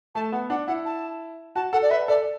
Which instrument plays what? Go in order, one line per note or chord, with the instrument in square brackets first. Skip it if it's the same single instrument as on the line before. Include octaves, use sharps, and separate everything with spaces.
[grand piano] A3 [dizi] A5
[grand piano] B3 [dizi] F#5
[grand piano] D4 [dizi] F#5
[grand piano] E4 [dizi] F#5
[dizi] A5
[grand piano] F#4 [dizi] A5
[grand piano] A4 [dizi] F#5
[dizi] D5
[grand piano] B4 [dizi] E5
[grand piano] A4 [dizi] D5